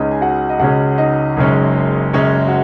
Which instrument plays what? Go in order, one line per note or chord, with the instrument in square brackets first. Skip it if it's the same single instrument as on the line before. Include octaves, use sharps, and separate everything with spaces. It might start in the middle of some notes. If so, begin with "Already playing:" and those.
Already playing: [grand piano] C#2 C#3 G#3 C#4 D#4 D#5
G#5
F#4 F#5
D#5
C#2 C#3 G#3 C#4 F#4 F#5
D#4 D#5
F#1 F#2 C#3 G#3 C#4
F#1 F#2 C#3 G#3 C#4 C#5
F#4